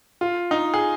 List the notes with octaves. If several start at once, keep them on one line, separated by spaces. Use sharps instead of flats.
F4
D#4
G#4